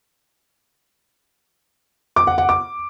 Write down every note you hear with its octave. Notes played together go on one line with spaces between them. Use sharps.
D6
F#5
F#5
D6